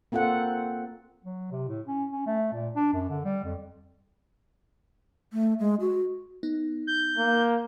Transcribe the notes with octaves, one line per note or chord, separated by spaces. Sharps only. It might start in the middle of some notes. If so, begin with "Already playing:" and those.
A#3 C4 F4 A4 F#5
F#3
C3
A2
C#4
C#4
A3
A#2
D4
F#2
D3
G3
F2
A3
G#3
F#4
B3 D#4
G6
A#3